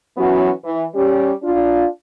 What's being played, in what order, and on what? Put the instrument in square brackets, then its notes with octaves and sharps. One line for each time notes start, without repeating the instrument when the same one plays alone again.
[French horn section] E3 F#3 B3 C#4 F#4
E3
G3 C#4 G4
D4 F4